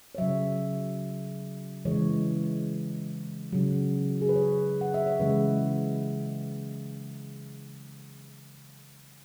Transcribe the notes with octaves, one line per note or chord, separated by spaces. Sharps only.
C#5
C#3 F#3 E5
C#3 E3 G#3 C#5
C#3 F#3
G#4
B4
C#5
F#5
E5
C#5
C#3 E3 G#3 B4